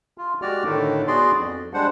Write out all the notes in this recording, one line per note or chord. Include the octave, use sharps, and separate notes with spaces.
F4
G#3 F#4 G4 D5 F6
A2 D3 D#3 A3
B3 F#4 G#4 D5 C6
F2
G3 G#3 D4 C5 F#5